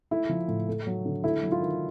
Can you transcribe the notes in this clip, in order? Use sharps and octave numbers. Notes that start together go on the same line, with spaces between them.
A3 E4
F3
A2
A3
F#3
D3
A3 E4
F#3
F4
D#3